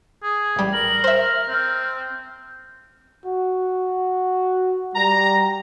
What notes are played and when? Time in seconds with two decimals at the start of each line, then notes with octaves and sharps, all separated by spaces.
0.23 G#4
0.56 A1 G3
0.73 A#4 F#7
1.04 C5 E5 F6
1.49 C4
3.26 F#4
4.95 G3 A#5